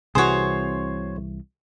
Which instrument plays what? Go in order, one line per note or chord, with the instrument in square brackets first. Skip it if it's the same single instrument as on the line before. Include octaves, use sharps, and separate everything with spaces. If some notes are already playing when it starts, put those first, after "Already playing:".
[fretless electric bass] C2 C3 E3 [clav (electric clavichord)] F#4 G#4 [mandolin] C5 C#5